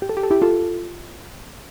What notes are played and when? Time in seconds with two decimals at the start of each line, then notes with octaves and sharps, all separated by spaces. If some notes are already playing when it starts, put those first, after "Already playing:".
0.02 G4
0.09 A4
0.17 G4
0.23 A4
0.31 E4 G4
0.42 F4 A4